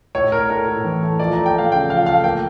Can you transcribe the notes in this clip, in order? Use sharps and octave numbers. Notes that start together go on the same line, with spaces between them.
A2 C#5
A2 A#4
A3 A#4
A2
E3
A3
F3 D5
A3 A#5
G5
A3 F5
C#3 G5
F3 F5
A3 F5
A#3 G5